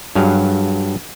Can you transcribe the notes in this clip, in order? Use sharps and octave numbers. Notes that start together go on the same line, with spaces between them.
G2 F#3 G#4 F5